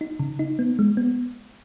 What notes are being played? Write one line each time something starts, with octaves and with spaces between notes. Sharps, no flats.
D#4
C#3
D#4
B3
G#3
B3